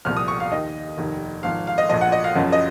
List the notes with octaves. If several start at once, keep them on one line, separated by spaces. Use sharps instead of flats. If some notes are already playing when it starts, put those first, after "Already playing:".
C2 A#2 F3 F6
D#6
C#6
F5
D#2 D#3 D#5
F1 D#2 D#3
G#1 G#2 F3 F5
F5
D#5
A#1 A#2 F3 D#5
F#5
D#5
F5
F#1 F#2 C#3 F3
D#5